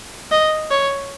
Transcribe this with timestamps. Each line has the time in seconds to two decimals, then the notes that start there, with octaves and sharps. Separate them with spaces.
0.31 D#5
0.71 C#5